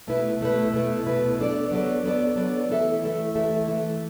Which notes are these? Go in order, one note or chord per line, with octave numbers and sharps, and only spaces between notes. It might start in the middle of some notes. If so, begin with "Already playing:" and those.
B2 A3 E4 B4
B2 A3 E4 B4
B2 A3 E4 B4
B2 A3 E4 B4
F#3 B3 D4 A4 D5
F#3 B3 D4 A4 D5
F#3 B3 D4 A4 D5
F#3 B3 D4 A4 D5
E3 A3 E4 A4 E5
E3 A3 E4 A4 E5
E3 A3 E4 A4 E5
E3 A3 E4 A4 E5